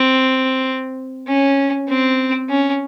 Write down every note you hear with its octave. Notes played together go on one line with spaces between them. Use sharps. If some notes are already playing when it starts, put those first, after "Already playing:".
Already playing: C4
C#4
C4
C#4